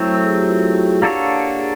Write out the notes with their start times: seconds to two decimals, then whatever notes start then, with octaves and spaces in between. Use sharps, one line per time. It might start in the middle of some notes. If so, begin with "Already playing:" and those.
Already playing: F#3 A3 C4 E4
0.16 A4
0.24 G#4
0.31 G4
0.39 F#4
0.46 F4
0.60 E4
0.74 F#4
0.84 G#4
0.88 G4
1.02 A#3 D4 F#4 A4 C#5
1.57 G#4